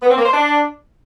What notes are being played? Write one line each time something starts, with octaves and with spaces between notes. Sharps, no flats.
B3
C4
A#3
C5
D4